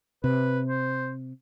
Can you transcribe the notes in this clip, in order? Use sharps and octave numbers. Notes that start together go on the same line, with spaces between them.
C3 B4
C5